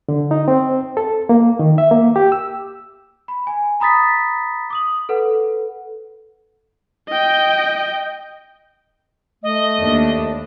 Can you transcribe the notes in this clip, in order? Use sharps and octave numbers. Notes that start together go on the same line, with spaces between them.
D3
D#4
C4
A4
A#3
D#3
E5
A#3
G4
E6
B5
G#5
A#5 B5 D#6 A6 B6
D6 D#6 F#7
A4 B4 F#5
D#5 G5
A3 D#5
D#2 D4